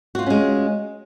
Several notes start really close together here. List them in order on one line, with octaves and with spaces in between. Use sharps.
F#4 F4 G3 C#4 G#3